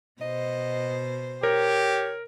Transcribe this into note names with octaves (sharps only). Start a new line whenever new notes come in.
B2 C5 D#5
G4 A#4 C#5